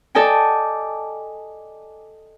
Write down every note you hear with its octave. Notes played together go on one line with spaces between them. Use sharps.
A4 D5 D#5 G5 G#5